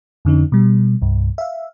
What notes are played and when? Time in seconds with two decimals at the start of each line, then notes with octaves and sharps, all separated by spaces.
0.25 F2 D3 C#4 D#4
0.52 B2 G3
1.02 C2 G2
1.38 E5 F5